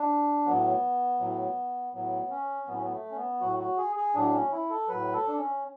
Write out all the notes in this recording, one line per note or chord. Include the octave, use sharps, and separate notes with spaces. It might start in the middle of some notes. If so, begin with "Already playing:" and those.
Already playing: D4
A2 F#3 B3
A2 F#3
A2 F#3 B3
C#4
A2 F#3 B3
C#4
B3
A3
C#4
B3
A2 F#3 F#4
F#4
G#4
G#4
A2 F#3 D4
C#4
E4
A4
A2 F#3 B4
A4
D4
C#4